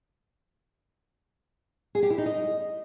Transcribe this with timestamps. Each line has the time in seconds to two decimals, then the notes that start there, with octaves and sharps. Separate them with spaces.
1.95 G#4
2.03 G4
2.10 E4
2.18 D#4
2.26 D#5